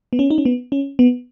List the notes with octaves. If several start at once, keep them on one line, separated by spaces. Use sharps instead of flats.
B3
C#4
D#4
C#4
B3
C#4
B3